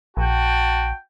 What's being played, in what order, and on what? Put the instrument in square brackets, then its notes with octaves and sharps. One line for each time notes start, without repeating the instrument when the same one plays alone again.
[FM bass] A#1 [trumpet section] F#4 G5 A5